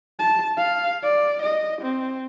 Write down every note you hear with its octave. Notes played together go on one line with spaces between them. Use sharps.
A5
F5
D5
D#5
C4